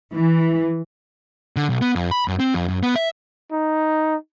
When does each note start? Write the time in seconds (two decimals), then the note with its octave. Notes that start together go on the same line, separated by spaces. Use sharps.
0.12 E3
1.56 D3
1.69 B1
1.81 B3
1.96 F2
2.11 B5
2.28 F#2
2.40 C4
2.54 F2
2.68 F#2
2.83 B3
2.96 E5
3.52 D#4